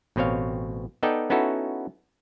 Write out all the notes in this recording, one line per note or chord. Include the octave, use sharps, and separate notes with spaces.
A1 B2 C4 C#5 F5
B3 D#4 A4 D5 D#5 G5
B3 C#4 D#4 E4 F#4 A4